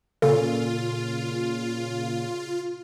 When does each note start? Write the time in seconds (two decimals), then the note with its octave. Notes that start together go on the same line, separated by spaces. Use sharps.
0.22 A#2 C#3 F4 A4